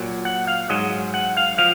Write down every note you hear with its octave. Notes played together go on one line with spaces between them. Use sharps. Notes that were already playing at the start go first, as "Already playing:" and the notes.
Already playing: A#2 F#3
F#5
F5
G#2 F#3 D#5
F#5
F5
F3 F5